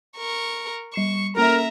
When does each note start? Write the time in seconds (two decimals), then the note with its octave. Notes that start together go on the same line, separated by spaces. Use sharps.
0.17 A#4 C#6
0.94 G3 C#6 C7 E7
1.37 A#3 C#4 A4 A#4 E5 A#5